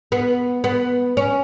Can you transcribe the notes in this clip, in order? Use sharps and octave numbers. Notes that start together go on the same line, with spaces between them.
B3
B3
C#4